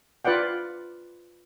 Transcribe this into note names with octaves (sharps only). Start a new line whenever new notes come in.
F4 B4 D5 F#5 G5